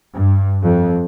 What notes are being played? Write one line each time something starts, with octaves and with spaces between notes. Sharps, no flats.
G2
F2